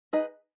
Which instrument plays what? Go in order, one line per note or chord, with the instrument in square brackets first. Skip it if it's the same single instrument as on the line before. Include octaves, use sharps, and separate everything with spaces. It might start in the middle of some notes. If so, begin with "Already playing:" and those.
[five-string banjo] D#4 G#4 B4 D#5